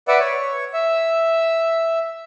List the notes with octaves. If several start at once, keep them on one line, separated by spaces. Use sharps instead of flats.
B4 D5 E5 F#5
C#5
E5